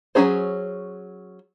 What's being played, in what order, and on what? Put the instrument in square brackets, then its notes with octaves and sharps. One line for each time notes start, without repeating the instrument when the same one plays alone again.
[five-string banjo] F#3 A#3 C#4 G#4 C5